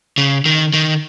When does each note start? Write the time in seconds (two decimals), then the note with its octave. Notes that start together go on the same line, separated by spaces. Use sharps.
0.18 C#3
0.45 D#3
0.74 D#3